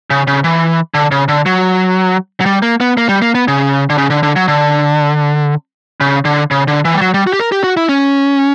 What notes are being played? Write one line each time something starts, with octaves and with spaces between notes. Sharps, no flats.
C#3
C#3
E3
D3
C#3
D3
F#3
F#3
G3
A#3
B3
A#3
G3
A#3
B3
C#3
D3
C#3
D3
D3
F#3
D3
C#3
D3
C#3
D3
E3
G3
F#3
G3
F#4
G4
A#4
G4
F#4
E4
C#4